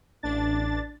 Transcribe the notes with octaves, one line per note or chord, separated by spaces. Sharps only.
A1 D4 A6